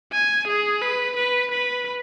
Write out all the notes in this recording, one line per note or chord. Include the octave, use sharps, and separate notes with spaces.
G#5
G#4
B4
B4
B4